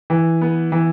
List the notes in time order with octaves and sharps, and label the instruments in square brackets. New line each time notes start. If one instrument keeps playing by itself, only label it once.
[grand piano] E3
B3
E3